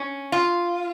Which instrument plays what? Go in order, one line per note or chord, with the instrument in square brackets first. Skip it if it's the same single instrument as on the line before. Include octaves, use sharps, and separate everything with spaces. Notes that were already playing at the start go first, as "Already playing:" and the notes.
Already playing: [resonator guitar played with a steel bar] C#4
F4